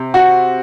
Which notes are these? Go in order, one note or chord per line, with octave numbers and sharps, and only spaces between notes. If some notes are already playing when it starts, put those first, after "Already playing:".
Already playing: C3
F#4